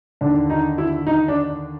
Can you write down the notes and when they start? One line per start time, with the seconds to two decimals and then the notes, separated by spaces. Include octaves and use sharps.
0.21 D#2 D3 D4
0.50 D#4
0.78 E4
1.07 D#4
1.28 D4